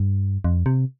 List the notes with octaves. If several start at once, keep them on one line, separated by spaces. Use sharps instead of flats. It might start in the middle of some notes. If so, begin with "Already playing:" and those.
Already playing: G2
F2
C3